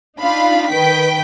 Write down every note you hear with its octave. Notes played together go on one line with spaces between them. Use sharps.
D4 D#4 F4 F5 B5
D#3 B4 G5 B6